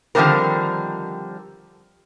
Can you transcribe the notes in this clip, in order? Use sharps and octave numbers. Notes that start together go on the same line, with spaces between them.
D3 D#3 F3 G3 C4 A#4